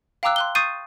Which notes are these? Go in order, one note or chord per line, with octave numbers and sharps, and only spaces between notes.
F5 G5 A#5 D6 E6 F#6
C6 F#6 G7
C#6 D#6 G6 A6 C7 D#7